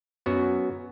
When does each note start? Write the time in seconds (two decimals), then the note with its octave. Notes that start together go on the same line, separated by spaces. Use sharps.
0.26 F#2 F#3 B3 F#4